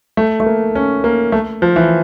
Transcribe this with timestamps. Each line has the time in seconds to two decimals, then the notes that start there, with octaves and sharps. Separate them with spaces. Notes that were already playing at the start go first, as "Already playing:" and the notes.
0.17 A3
0.40 A3
0.46 A#3
0.75 C#4
1.04 A#3
1.32 A3
1.62 F3
1.76 E3